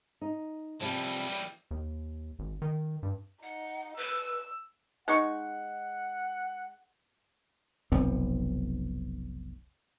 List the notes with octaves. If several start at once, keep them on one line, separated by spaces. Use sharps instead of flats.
D#4
C3 E3 F3 G3
D#2
G#1
D#3
G2
D#4 F#5
B4 E6
G#3 D#4 F#5 C#6
F1 B1 F3 C4